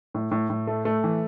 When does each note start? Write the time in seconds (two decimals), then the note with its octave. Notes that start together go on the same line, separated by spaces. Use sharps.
0.14 A2
0.31 A2
0.50 A2
0.67 A3
0.85 A3
1.04 E3